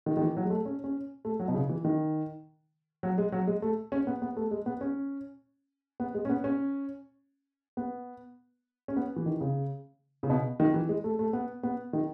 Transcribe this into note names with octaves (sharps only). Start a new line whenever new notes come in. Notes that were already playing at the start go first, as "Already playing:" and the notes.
D#3
D#3
E3
F#3
G#3
A3
C#4
C#4
A3
F#3
B2
C#3
E3
D#3
F#3
G#3
F#3
G#3
A3
C#4
B3
B3
A3
G#3
B3
C#4
B3
G#3
C#4
B3
C#4
B3
C#4
B3
E3
D#3
C#3
C#3
B2
D#3
E3
G#3
A3
A3
B3
B3
D#3